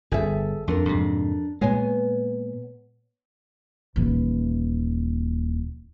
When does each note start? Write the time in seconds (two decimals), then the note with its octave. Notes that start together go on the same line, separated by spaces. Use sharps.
0.12 G1 G#4 A4 E5
0.68 F2 D4 A4 A#4
0.85 F2 G#2 C3
1.61 A#2 G#3 B3 C#5 G#5
3.96 D#1 E3